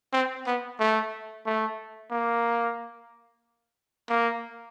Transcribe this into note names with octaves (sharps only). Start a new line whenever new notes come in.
C4
B3
A3
A3
A#3
A#3